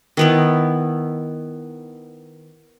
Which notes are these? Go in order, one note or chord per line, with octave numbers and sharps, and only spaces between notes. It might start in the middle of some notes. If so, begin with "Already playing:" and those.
D#3 B3 E4